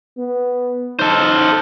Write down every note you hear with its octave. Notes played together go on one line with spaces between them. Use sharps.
B3
D#4 A4 C5